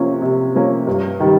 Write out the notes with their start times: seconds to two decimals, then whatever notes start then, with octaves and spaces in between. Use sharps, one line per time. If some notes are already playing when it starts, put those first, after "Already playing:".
Already playing: C3 F3 A#3 C#4
0.22 C3
0.55 F3 A#3 C#4
0.87 G2
1.20 D#3 G3